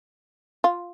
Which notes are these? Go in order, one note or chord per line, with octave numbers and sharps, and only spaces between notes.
F4